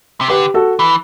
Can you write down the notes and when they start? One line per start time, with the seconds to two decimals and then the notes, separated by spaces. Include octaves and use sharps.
0.21 C3
0.29 D3 G4 B4
0.54 F#4 A4
0.79 E3